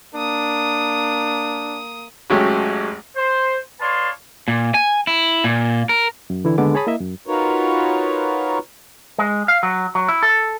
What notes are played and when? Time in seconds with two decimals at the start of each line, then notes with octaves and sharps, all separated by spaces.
0.15 A#3 D4 D#6
2.30 G#1 F#3 G#3 A3 C#4 G4
3.16 C5
3.80 B4 C#5 D5 F5 A5 C6
4.48 A#2
4.74 G#5
5.07 E4
5.44 A#2
5.89 A#4
6.30 F#2
6.45 D3 E3 E4
6.58 D#2 D3 G#3 B3 D6
6.75 G#4 C#5 A5 B5 D#6
6.87 A#3 E4 D#5 E5
7.01 F#2
7.27 D#4 F4 F#4 A#4 B4 C#5
9.18 G#3
9.48 F5
9.63 F#3
9.95 F#3
10.09 E4
10.23 A4